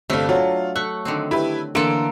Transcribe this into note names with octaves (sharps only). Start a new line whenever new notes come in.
G1 C3 A3 D4 F5
F#3 F4
A3 C#6 F#6
D3 D#3 C4
E4 G4 B4
D3 E3 A#3 A4 C6 D7